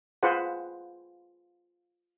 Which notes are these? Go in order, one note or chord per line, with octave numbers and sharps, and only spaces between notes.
F4 G#4 B4 C5 F#5